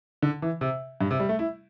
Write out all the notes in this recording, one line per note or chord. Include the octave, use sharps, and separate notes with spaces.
D3
E3
C3
G2
C3
G3
A3
E4